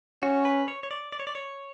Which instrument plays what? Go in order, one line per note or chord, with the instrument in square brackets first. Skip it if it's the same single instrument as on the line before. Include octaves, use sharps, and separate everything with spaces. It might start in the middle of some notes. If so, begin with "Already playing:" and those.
[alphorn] C#4 [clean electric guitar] F#4
[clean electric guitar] B4
C#5
C#5
D5
D5
C#5
D5
C#5